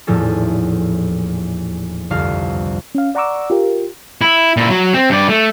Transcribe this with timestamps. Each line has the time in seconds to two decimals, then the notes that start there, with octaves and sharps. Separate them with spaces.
0.07 D#1 E2 A2 F3 C#4 A4
2.10 G1 C2 F2 F5 F6
2.95 C#4 F5
3.15 D5 F#5 A#5 C#6 D6 E6
3.50 F4 G4 A#4
4.21 E4
4.57 A#2 E4
4.70 F#3
4.94 C4
5.10 G2 D5
5.29 A3